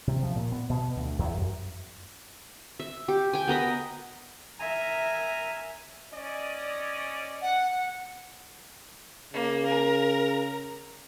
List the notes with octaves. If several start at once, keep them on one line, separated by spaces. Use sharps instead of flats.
C3
F3
A#2
B3
B2
D2
E2
F#2
E5
G4
G5 G#5
B3 A#4 D#5 B5
A#4 E5 G#5 A#5
C#4 D5 D#5
F#5
C#3 A#3
A#4 A#5